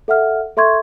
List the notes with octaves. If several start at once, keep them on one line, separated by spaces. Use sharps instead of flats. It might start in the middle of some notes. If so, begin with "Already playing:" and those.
A4 E5 F#5 F6
A4 E5 C6 C#6 G#6